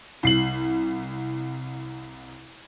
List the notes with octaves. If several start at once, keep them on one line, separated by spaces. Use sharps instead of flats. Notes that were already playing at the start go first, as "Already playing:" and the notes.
C2 C7 F#7